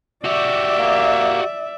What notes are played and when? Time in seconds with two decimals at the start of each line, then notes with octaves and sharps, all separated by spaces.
0.24 F#4 G4 D5 E5
0.78 A#3